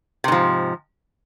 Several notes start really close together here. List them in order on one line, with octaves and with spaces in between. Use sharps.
C3 G#2 F3